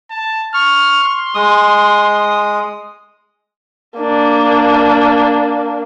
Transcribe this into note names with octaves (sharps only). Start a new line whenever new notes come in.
A5
C#6 F6
C6
G#3 D#6
A#3 D4